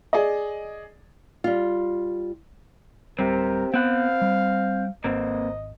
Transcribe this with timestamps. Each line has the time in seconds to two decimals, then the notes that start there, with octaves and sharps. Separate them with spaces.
0.13 G#4 D5 D#5
1.44 G3 F4
3.19 D1 G3 C4 G4 A#4
3.74 B3 C4 F5 F#5
4.21 G3
5.04 G#1 A#3 C4 D#5